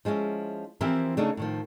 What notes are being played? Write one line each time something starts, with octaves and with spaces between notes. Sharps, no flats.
F3 G#3 C#4 E4
E3 F3 C4 E4 G4 A#4
C#3 A3 D4 D#4
A2 D#3 F3